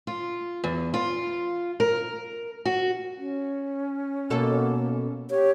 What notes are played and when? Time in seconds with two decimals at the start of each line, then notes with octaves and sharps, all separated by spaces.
0.07 F4
0.64 E2
0.94 F4
1.80 A#4
2.65 F#4
3.17 C#4
4.30 B2 A#3 F#4 A4
5.30 G4 C#5